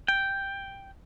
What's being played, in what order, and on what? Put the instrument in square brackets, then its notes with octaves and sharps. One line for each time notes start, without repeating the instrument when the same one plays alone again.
[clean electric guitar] G5